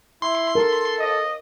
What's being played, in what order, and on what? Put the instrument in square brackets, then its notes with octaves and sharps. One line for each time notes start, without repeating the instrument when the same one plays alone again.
[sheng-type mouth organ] E4 [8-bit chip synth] C6
[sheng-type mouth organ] A4 [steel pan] A#4
[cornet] D#5